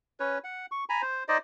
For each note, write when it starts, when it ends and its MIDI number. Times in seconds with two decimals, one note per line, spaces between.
0.20 0.38 61
0.20 0.38 71
0.20 0.38 73
0.44 0.66 78
0.71 0.84 85
0.89 1.02 80
0.89 1.02 82
0.89 1.02 83
1.02 1.24 72
1.28 1.38 63
1.28 1.38 72
1.28 1.38 74
1.28 1.38 75